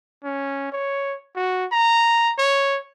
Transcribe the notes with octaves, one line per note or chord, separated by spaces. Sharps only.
C#4
C#5
F#4
A#5
C#5